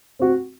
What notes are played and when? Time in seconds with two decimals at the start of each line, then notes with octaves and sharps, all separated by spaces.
0.19 C4 F#4